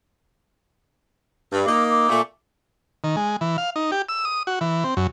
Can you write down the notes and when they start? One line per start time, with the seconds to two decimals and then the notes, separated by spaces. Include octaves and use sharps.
1.52 G2
1.66 A#3 D#4 D6
1.90 D6
2.09 A#2 A3
3.04 D#3
3.16 G#3
3.41 E3
3.58 F5
3.76 D#4
3.92 G4
4.09 E6
4.25 D#6
4.47 F#4
4.61 E3
4.84 C4
4.97 F#2